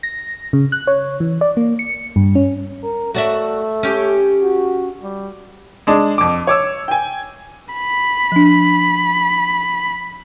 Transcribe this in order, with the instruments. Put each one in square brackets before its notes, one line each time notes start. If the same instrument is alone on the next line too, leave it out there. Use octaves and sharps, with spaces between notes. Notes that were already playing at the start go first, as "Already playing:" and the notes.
[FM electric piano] A#6
C#3
F#6
C#5
E3
D5
A#3
C#7
G2
C#4
[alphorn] A#4
[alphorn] A3 [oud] F#4 D5 E5
[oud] C#4 G4
[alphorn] F#4
G3
[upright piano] G#3 D4 G#4
F2 D6
C#5 D6 E6
G5 G#5
[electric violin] B5
[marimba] F3 D4